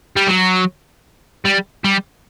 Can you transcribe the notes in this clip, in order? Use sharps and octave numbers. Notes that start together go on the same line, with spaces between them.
G3
F#3
G3
G3